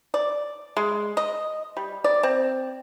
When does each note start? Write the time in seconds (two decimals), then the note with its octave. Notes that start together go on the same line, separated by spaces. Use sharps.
0.14 D5
0.77 G#3
1.17 D#5
1.77 G3
2.04 D5
2.23 C4